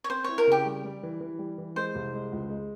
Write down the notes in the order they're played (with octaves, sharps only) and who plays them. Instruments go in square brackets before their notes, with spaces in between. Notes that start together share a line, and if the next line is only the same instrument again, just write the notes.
[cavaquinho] C#5
[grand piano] C4 [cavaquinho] C5
[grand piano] E4 [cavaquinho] C#5
[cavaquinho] A#4
[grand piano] C#3 [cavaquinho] G4
[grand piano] G3
G3
E3
E3
G3
E3
[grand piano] G#3 [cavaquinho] C5
[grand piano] C2
G#3
C#2
G#3